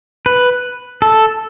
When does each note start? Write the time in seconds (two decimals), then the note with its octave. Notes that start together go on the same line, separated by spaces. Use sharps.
0.26 B4
1.02 A4